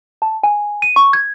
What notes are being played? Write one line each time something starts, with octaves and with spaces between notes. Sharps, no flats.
A5
G#5
D#7
C#6
G#6